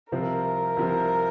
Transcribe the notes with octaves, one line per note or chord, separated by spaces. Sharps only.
C2 C3 F3 C4 A#4
C2 C3 F3 C4